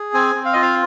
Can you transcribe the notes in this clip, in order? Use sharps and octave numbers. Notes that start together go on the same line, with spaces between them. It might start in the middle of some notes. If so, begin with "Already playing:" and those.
Already playing: G#4
C4 G#5
C4
F5
F4 D#5
F5